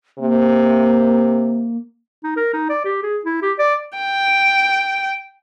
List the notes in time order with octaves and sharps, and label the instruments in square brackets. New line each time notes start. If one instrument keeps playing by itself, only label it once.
[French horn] C3 [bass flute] A#3
[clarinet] D#4
A#4
D#4
D5
G4
G#4
E4
G4
D5
[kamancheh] G5